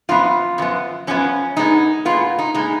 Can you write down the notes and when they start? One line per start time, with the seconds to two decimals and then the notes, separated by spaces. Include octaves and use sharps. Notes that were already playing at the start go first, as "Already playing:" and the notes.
0.09 F#2 F3 B3 F4
0.58 F#2 F3 B3
1.07 F#2 F3 B3 C#4
1.57 A#2 G#3 B3 D#4
2.05 A#2 G#3 B3 F4
2.39 D#4
2.54 A#2 G#3 B3 D#4